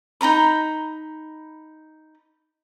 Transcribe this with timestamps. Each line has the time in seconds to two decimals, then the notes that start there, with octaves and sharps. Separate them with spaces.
0.21 D#4 F#4 A#5 B5